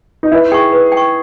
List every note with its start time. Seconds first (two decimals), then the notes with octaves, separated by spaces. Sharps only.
0.23 D#4
0.32 E4 B4
0.52 G#4 G5 C#6
0.72 B4
0.92 G5
0.97 C#6